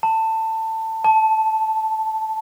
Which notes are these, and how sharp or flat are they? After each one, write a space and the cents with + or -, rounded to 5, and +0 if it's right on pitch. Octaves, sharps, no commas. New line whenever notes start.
A5 +20
A5 -5